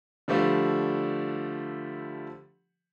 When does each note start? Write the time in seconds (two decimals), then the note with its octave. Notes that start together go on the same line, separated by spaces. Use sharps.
0.28 D3 F3 G3 A3